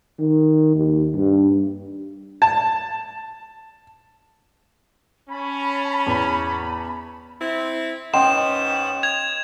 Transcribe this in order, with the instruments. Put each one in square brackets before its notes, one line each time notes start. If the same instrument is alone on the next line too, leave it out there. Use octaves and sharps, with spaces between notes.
[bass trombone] D#3
D#2
G2
[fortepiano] A5
[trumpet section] C#4 [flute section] A5 B5
[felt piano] E2
[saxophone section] C4 E4
[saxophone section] G#2 B3 C#4 [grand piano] D#5 G5 C6 [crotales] E7
[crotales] G#6 F7